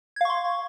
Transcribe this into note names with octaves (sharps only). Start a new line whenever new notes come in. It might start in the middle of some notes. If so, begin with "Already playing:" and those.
F5 C6 C#6 G#6